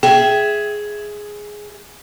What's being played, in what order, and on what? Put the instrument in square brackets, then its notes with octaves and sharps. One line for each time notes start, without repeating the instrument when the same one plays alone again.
[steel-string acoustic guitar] G#4 E5 [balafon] G5